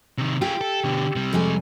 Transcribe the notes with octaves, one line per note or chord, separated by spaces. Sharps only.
C3 D#3
F4 G4 G#4
A4
B2 D3
C3 G3
F2 G#3 G#5